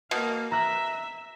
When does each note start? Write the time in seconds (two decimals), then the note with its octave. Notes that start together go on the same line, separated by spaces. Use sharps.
0.11 B2 A#3 F5
0.51 E5 A#5 F#6